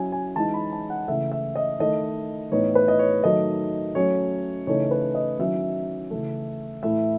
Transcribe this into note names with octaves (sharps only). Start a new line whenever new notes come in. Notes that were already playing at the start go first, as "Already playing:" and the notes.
Already playing: F#3 C#4 E4 G#5
G#5
E3 G#3 D#4 A5
B5
A5
F#5
C#3 E3 A3 E5
E5
D#5
D#3 A3 E4 D#5
A2 E3 B3 D#4 C#5
B4
D#5
C#5
D#3 F#3 A3 D#4 D#5
F#3 A3 C#4 C#5
C#3 E3 A3 D#4 C#5
B4
D#5
D#3 F#3 C#4 E4 E5
C#3 E3 A3
A2 E3 A3 E4 E5